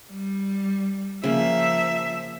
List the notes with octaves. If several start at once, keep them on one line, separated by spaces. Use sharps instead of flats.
G3
C#3 F3 A#3 E5